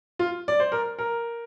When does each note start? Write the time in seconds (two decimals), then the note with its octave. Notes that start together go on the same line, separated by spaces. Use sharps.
0.19 F4
0.48 D5
0.60 C5
0.72 A#4
0.99 A#4